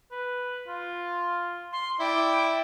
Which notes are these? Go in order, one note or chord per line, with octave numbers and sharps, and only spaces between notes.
B4
F4
C6
E4 D5 G5